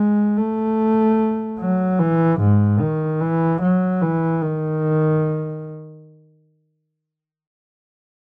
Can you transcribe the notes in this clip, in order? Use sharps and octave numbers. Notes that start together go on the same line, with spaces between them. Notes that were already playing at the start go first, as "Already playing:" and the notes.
Already playing: G#3
A3
F#3
E3
G#2
D#3
E3
F#3
E3
D#3